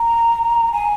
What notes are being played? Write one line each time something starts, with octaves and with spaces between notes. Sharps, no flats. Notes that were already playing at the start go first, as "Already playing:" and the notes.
Already playing: A#5
G#5